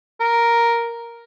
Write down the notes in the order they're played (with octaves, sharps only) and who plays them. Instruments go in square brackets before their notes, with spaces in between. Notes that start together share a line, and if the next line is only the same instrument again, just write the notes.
[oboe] A#4